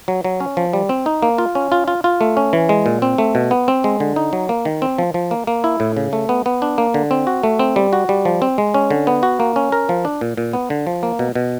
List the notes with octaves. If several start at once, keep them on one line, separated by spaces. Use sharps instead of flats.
F#3
F#3
C#4
F3
G3
C4
D#4
A#3
F4
C#4
F4
F4
F4
A3
C#4
E3
G#3
A#2
C4
A3
B2
B3
C4
G#3
D3
D#4
F#3
A#3
D#3
C4
F3
F3
A#3
A#3
E4
A2
C#3
A3
B3
B3
D4
A#3
D3
C4
F#4
A3
C4
G3
F#4
G3
F3
C4
G#3
C#4
D3
B3
F#4
A#3
C#4
A#4
F3
D4
A#2
A#2
B3
D3
F3
A#3
B2
B2